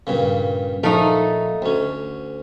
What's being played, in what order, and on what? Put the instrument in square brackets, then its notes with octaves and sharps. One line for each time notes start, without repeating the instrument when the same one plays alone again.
[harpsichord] G2 A#2 C#3
[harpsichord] A#1 F5 [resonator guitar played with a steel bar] A3 D#4
[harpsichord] D2 C#4